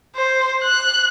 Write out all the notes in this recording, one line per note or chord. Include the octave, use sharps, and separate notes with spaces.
C5
F#6